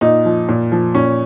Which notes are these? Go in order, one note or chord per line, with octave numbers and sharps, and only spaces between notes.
A#2 D#4
F3
A#2
F3
A#2 C#4